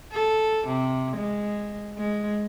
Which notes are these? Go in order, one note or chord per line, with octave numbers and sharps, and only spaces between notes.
A4
C3
G#3
G#3